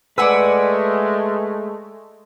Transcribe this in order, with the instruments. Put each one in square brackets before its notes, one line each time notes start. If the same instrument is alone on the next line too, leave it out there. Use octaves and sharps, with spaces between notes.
[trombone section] G#3 A3 [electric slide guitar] B4 D5 [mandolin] F#5 G#5 E6